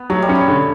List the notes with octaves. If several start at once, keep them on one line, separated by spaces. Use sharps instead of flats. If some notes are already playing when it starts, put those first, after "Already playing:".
Already playing: B3
F#3 A3
G3
C#4
A3
D3